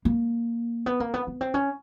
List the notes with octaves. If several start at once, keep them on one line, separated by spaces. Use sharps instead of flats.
A#3
B3
A#3
B3
B3
C4
C#4